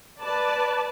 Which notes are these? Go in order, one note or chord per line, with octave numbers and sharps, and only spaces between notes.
B4 D5 A5